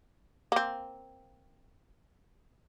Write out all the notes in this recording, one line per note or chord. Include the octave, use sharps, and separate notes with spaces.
A#3 C4